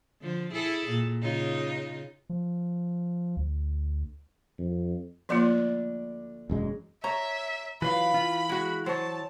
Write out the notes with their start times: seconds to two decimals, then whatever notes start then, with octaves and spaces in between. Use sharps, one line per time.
0.22 D3 F3
0.53 E4 G#4 A4
0.89 A#2
1.22 C#3 D#4 F4
2.29 F3
3.37 D2
4.59 F2
5.29 D2 F3 A#3 D4 F4 D5
6.50 E1 F#2 G#3
7.04 C#5 E5 A#5
7.82 E3 F#3 F4 B4 F5 B5
8.14 E3 F4
8.49 G#3 F#4
8.86 F#3 C5 C#5 A5